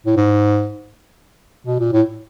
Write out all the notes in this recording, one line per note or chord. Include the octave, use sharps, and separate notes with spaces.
A2
G#2
B2
A#2
A2